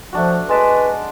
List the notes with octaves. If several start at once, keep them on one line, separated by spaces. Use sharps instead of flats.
F3 A3 D4 F#4
G#3 B4 A5 D6